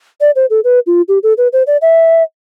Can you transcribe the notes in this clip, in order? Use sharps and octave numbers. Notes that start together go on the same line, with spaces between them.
D5
C5
A4
B4
F4
G4
A4
B4
C5
D5
E5